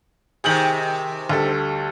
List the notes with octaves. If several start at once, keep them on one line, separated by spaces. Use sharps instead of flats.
C3 D#3 G#4 G6 F#7
D2 G3 A4